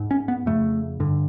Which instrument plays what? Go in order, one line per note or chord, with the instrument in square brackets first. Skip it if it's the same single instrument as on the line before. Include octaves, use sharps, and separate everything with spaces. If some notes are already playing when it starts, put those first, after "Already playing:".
Already playing: [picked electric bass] G#2
C#4
B3
F2 C#3 A3
G2 D3